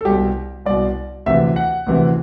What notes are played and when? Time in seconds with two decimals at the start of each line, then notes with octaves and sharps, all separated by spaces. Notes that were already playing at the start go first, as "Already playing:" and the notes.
0.01 A4
0.05 C2 B2 G4
0.65 C2 B2 D5
1.26 D2 C3 E3 E5
1.56 F#5
1.87 D2 C3 E3